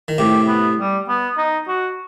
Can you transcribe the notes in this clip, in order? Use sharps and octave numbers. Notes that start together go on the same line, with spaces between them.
D#3
A2 C3 G4
B3
G3
B3
D#4
F#4